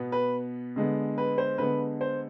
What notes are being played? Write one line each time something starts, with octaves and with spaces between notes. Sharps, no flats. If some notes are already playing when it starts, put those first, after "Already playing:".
Already playing: B2 B3
B4
D3 G#3 B3
B4
C5
D3 G#3 B3 B4
C5